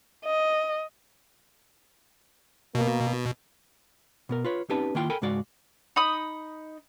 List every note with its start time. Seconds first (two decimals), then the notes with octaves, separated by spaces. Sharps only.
0.25 D#5
2.75 B2 A#3
4.29 B2 B3 A#4
4.45 F4 B4 C#5
4.69 C4 C#4 D#4 G4 B4 A5
4.95 D#3 A#3 E4 F4 G5 C6
5.10 A4 A#4 G5 G#5 B5
5.22 C#2 G#2 G#3 F#4 D5 F5
5.96 D#4 B5 D#6